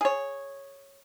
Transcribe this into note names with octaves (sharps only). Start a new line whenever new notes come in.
G#4 C#5